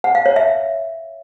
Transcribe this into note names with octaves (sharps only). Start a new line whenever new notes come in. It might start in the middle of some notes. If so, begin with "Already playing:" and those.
F#5
F5
C#5
E5